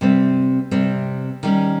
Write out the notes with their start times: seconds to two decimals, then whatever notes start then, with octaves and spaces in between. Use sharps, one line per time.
0.01 C3 G3 C4
0.71 C3 G3 C4
1.43 D#3 G3 C#4